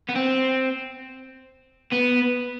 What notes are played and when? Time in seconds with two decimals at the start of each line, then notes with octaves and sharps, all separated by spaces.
0.09 B3
0.15 C4
1.92 B3